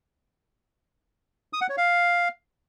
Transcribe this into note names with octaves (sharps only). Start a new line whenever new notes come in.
D#6
F#5
C#5
F5